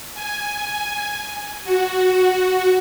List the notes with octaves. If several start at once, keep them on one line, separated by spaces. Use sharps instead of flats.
G#5
F#4